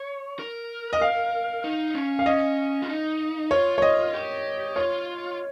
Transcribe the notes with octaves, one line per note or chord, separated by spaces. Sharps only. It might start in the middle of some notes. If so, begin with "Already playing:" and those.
Already playing: C#5
A#4
D#5
F5
D#4
C#4
F5
C#4 D#5
F4
D#4
F4 C#5
C#5
D#5
G4
F4 C#5